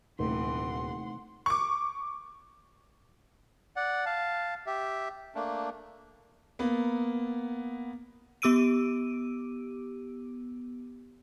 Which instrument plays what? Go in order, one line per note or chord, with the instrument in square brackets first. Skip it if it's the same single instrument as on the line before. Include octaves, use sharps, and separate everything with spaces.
[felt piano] D#1 [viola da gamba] C3 E3 [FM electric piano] A3 D#4 [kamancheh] F#5 C6
[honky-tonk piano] C#6 D6
[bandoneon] D5 F#5
F5 A5
G4 E5
A3 A#3 D4
[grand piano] A#3 B3
[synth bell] B3 G4 D6 E6 D7 D#7